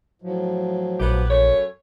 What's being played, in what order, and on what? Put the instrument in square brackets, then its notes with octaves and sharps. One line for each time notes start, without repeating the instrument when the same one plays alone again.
[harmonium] A2 F3 F#3
[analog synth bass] A#1 [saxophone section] B3 G4 B4
[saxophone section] F#2 A3 C#5